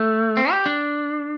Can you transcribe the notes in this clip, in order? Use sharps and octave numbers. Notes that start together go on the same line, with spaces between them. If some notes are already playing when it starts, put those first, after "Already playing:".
Already playing: A3
C4
G4
D4